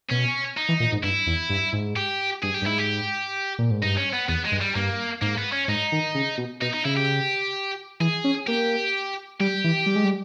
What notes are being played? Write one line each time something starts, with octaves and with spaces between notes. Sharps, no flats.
B2 C#4
D#4
E3
A#2
G#2
G2 E4
E2
G2
G#2
G4
G2 G#4
G4
G2
G#2 E4
G4
A#2
G#2
G2 D#4
C#4
B3
E2 B3
G#3
G2
G3
G2 A#3
G#2 A#3
B3
C#4
G#2 D#4
D#3
C#3
B2
B2 D#4
D#4
C#3 E4
G4
E3 G#4
C#4
A#3 G4
G3 G4
E3
G3
G#3
G3